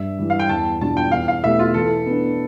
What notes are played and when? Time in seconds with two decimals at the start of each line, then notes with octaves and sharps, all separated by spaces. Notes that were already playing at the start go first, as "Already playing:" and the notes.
Already playing: G2 E5
0.19 E3 G3
0.30 F5
0.39 G5
0.49 E2 A5
0.80 B2 G3 D4 F4 A5
0.97 G5
1.11 E2 F5
1.28 F5
1.43 B2 A3 E4 G4 E5
1.59 F4
1.74 E3 A4
2.06 B3 D4